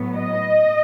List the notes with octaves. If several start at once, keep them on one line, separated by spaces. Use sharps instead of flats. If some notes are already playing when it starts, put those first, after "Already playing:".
Already playing: A2 F#3 B3
D#5